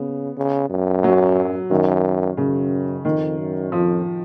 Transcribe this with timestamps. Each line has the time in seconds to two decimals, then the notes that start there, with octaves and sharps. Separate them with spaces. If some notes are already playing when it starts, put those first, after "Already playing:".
Already playing: C#3 B3
0.37 C#3
0.70 F#2
1.04 F#3
1.70 F#2 D#3
2.37 F#2 C#3
3.05 F2 D#3
3.38 F#2
3.71 F2 F3